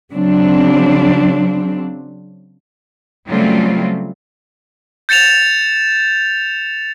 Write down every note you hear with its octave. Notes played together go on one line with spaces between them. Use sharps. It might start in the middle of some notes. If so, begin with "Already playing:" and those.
C#3 F#3 C4 D4
C#3 F#3 G3 A3 C4 F4
G6 A6 C#7 E7 F7